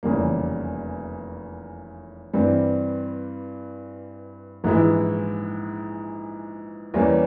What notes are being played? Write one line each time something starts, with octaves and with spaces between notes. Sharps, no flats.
F1 E2 C#3 G3 A#3
G2 E3 G3 C4
A#1 G#2 E3 G#3 E4
E2 E3 G3 A#3 C#4